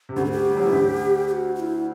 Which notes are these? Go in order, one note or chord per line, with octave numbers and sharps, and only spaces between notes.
C3
D2 D3 G4
A4
G4
G3
F#3
E3
D2 D3
G4
F#4
F#4
E4